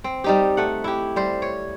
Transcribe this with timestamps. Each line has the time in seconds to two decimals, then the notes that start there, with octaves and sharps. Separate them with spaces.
0.04 C4
0.24 G3 D#4 G4
0.57 A3 F#5
0.84 E4 G4
1.16 G3 C5
1.42 C#5